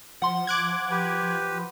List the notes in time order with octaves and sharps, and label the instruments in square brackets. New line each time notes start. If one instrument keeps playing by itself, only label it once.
[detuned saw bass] F3 [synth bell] F#5 C6
[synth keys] D6 F#6 G#6
[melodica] G4 B4
[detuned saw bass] F3